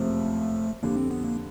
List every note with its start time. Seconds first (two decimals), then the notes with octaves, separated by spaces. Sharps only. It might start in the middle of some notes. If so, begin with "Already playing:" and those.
Already playing: F#1 F2 C3 F3 A3
0.83 F2 D3 G3 A#3
0.96 C4
1.11 B3
1.24 A#3